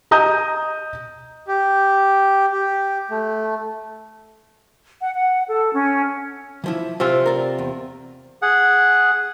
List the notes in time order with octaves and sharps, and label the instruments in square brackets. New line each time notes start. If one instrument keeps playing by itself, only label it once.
[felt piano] D#5 A#5 D#6 G6 D#7
[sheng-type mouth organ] G4
G4
A3
[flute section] F#5
F#5
A4
C#4
[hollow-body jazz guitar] E3 F3 E4
[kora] C3 C4 F4 [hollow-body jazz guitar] C5 E5 G#5
[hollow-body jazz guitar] A#4 D5
E2
[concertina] G#4 F#5